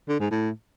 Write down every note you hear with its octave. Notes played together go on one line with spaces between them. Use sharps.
D3
G#2
A2